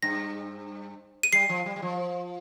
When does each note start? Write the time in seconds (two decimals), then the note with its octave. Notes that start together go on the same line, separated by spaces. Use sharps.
0.02 G2 A#6
1.23 D#7
1.33 G3 C7
1.49 F3
1.66 G3
1.76 G3
1.82 F3